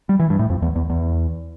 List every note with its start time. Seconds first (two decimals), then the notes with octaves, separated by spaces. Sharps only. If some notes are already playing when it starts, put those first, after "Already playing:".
0.09 G3
0.20 E3
0.30 G2
0.39 A2
0.50 F2
0.62 E2
0.76 E2
0.90 E2